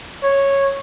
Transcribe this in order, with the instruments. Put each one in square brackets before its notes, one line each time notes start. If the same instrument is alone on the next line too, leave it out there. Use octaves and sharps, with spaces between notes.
[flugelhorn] C#5